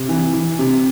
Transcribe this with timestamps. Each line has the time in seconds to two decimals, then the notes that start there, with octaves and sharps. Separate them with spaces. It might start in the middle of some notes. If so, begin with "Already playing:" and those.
Already playing: C3
0.09 E3
0.34 E3
0.59 C3